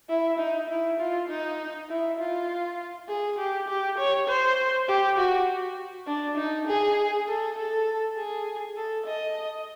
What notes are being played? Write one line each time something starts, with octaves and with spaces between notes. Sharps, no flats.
E4
D#4
E4
F4
D#4
E4
F4
G#4
G4
G4
C#5
C5
G4
F#4
D4
D#4
G#4
A4
A4
G#4
A4
D#5